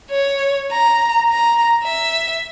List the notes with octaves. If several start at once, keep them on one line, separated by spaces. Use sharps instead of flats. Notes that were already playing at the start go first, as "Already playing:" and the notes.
C#5
A#5
A#5
E5